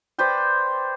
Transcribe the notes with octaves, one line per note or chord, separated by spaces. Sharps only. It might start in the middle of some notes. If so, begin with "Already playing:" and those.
B4 C5 D5 G5